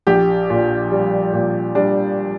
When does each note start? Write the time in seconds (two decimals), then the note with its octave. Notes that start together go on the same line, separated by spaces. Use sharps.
0.07 A#1 G4
0.50 A#2
0.92 G3
1.33 A#2
1.75 G3 D4